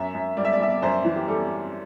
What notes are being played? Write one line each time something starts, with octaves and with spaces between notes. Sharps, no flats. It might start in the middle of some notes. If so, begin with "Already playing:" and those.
Already playing: F#2 E5
F#2
G3 D5
E5
D5
G3 E5
D5
F#2 C5
E3
G4
G3 A4